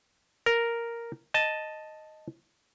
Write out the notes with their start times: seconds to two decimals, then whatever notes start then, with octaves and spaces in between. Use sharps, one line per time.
0.46 A#4
1.34 D#5 A5